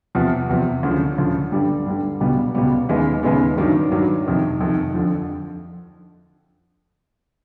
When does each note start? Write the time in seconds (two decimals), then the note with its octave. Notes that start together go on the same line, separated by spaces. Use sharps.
0.15 E2 C3 F3
0.49 E2 C3 F3
0.83 D2 C#3 F3
1.18 D2 C#3 F3
1.52 G2 D3 G3
1.86 G2 D3 G3
2.20 C#2 B2 G3 B3
2.55 C#2 B2 G3 B3
2.89 D#2 C#3 E3 G#3 B3
3.23 D#2 C#3 E3 G#3 B3
3.58 G2 D#3 F#3
3.91 G2 D#3 F#3
4.26 F2 C3 D#3
4.60 F2 C3 D#3
4.94 F2 D3 F3